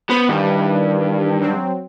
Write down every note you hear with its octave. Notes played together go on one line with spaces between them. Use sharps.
B3 C5 B5
G2 D#3 E3 G3
F#3 C4